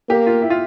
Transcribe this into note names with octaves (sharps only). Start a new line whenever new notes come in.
A#3 G4
F4
E4
F4